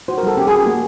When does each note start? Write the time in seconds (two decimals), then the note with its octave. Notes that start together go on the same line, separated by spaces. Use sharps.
0.08 F#4 C5
0.18 A#4
0.23 G3 A4
0.37 C#4 G4
0.47 G#4
0.52 F#4
0.67 A#3